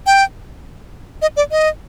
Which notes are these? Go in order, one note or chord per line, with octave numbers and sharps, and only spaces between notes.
G5
D#5
D5
D#5